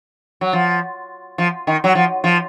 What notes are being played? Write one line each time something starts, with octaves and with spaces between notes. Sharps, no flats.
F#3
F3
F3
D#3
F#3
F3
F3